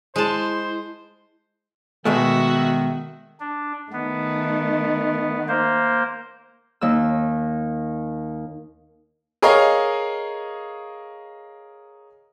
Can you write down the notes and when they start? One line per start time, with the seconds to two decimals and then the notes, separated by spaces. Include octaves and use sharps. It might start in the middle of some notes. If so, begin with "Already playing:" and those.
0.16 G#3 E4 C5 A5
2.05 B2 D#3 G#3 A3 F#4 E5
3.40 D4
3.92 D#3 A3 B3
5.48 A#3 C5
6.81 D#2 E6
9.42 G#4 A#4 C#5 D#5 F5